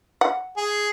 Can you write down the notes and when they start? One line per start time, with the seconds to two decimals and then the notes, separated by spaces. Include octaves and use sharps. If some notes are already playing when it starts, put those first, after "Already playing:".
0.21 F#5
0.57 G#4